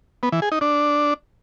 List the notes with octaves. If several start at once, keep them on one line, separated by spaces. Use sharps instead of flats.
B3
E3
G#4
D#4
D4